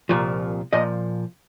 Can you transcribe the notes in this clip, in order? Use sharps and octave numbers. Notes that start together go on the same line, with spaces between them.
C2 A#2 F3
A#2 F3 D#5